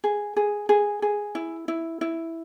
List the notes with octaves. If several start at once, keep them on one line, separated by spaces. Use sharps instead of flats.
G#4
G#4
G#4
G#4
E4
E4
E4